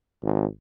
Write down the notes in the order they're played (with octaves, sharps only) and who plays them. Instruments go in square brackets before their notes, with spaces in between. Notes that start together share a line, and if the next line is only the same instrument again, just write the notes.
[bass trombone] G#1